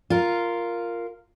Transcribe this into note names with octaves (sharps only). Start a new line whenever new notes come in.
F4 A#4